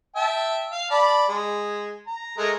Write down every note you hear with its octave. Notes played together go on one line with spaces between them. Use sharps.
E5 G5 A5
F5
D5 A5 B5
G#3
A#5
G#3 A3 A#4